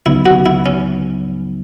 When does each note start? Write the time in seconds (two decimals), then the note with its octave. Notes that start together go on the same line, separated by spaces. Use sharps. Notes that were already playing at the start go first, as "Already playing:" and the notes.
0.06 C#2 C#3 F#3 B3 D#4 E4
0.26 F#4
0.46 E4
0.66 C#4